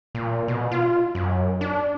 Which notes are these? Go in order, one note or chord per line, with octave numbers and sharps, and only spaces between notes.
A#2
B2
F4
F#2
D4